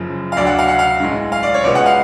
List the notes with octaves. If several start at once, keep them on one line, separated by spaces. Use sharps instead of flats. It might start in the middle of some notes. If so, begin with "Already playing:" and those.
Already playing: F#1 F#2 C#3 F3
F5
D2 D3 F#3 D5
F#5
F5
F#5
F5
B1 A2 G#3
F5
D5
C#5
C#2 B2 G#3 B3 D5
F#5
F5